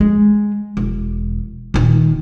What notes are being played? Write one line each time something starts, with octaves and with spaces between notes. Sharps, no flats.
G#3
E1
D#1 D#3